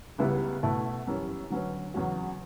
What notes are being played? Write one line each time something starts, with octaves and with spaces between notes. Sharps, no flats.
C#2 C#3 G3 B3 E4
B2 A3 E4
F#2 E3 G3 C#4
D3 F#3 C#4 F#4 B4
E2 C#3 F#3 C#4 F#4